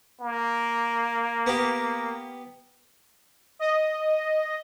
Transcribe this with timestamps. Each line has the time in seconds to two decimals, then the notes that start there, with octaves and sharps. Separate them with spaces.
0.21 A#3
1.46 B3 G4
3.59 D#5